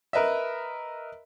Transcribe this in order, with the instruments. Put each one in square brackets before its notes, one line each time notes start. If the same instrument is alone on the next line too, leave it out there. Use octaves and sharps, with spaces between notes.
[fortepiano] A#4 B4 D#5 E5